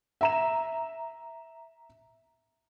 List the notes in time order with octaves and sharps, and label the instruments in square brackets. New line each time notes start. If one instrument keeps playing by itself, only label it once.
[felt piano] E5 A#5 E7